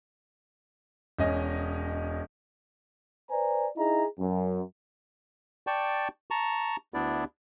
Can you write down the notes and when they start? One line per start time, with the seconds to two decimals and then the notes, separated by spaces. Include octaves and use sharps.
1.19 E1 C#4 D#5
3.31 B4 C5 D5 G#5 A#5
3.77 D#4 E4 G#4 D#5 A#5
4.19 F#2
5.67 D5 G5 A5 C#6
6.31 A5 A#5 C#6
6.94 D2 B3 D4 E4 D5